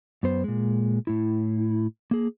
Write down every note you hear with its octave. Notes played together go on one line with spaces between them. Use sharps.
F#2 B3 C5
A#2 G#3
A2 E4
A#3 G#4